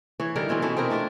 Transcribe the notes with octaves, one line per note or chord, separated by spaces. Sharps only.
E3 C#5
D3 D#3 G3 A#4
B2 E3 C4 C#4
B2 C#4 E4 A4
C4 D#4 E4 A#4
A3 D4 F4 A#4